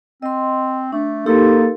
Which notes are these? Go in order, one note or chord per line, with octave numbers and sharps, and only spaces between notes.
C4 D#5 C6
A3 D4
A#3 D#4 G4 A4 C6